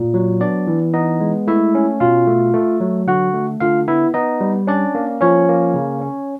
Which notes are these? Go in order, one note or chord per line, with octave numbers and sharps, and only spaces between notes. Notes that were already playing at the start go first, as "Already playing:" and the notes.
Already playing: A#2
F#3
B3 D4 D5
E3
B3 D#4 D#5
G#3
A3 E4 E5
C#4
B2 F4 F5
A3
A3
F#3
D3 F#4 F#5
A3
D3 F4 F5
B3 E4 E5
B3 D#4 D#5
G3
C#4 D4 D5
A#3
F3 C#4 C#5
A#3
C#3
C#4